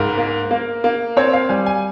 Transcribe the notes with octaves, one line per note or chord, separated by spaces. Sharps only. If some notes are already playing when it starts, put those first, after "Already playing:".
Already playing: C#2 G#2 A#4
A#3
A#3
A#3
C4 C#5
F5
G3 G#5
G#5